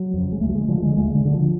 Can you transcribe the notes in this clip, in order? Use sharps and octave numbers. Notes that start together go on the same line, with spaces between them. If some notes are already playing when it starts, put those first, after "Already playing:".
Already playing: F#3
F2 C#3
G#3
D2 A3
F#3
G#3
D3 F3
G#3
D2 G#3
D3
D3 F#3
F3